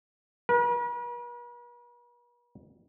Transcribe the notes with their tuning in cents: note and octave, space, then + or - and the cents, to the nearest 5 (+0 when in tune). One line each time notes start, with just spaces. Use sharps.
B4 -45